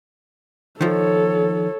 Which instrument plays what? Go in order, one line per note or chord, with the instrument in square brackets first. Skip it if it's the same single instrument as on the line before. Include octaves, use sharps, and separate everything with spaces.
[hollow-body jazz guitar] D#3 F3 [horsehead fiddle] A4 C#5